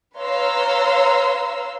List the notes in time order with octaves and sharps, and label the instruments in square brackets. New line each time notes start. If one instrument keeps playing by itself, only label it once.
[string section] B4 C#5 F5 A#5 C6 E6